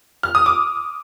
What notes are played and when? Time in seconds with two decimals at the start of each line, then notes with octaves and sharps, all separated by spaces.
0.23 F6
0.35 D#6
0.46 D6